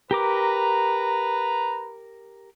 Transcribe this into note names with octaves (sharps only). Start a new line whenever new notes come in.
G4 A#4 B4 A#5 D6